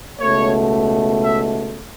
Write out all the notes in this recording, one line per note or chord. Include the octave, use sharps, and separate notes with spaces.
C#2 B2 A3 C#5
E5